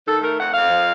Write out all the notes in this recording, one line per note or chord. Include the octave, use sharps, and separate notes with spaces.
D#3 A4
A3 A#4
F2 F#5
F2 F5
F3